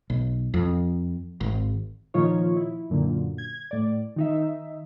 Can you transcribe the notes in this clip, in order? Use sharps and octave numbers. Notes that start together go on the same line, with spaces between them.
B1
F2
G#1
A#2 D#3 F3 D#4 F4 C#5
E4
F#2 A#2 D3
G#6
A2 D5
D#3 D#4 E5